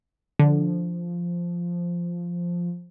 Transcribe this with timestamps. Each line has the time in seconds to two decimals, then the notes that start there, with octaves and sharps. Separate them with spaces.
0.39 D3 F3